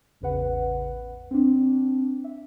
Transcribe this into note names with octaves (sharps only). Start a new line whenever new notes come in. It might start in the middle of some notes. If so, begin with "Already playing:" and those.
A1 E2 C#3 B4 F#5
C4 D4
E5